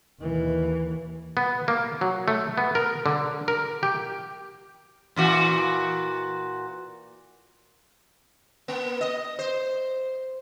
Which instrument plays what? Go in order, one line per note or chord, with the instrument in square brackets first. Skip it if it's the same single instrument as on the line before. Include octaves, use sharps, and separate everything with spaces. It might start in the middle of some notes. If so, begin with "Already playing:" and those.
[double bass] D#2 E3
[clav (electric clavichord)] B3
A#3
F#3
A3
B3
A#4
D3
A#4
G4
[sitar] A#2 E3 F#4
A#3
D#5
C5